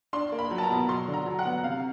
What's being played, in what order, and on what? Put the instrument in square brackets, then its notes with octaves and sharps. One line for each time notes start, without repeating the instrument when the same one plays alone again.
[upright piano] D4 C6
A#3
B5
F#3
A5
A#5
B2
F#3 C6
D3
A#5
F#3
F#5
B3
C3 F5